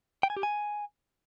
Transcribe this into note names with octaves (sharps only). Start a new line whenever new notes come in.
G5
G#5
G4
G#5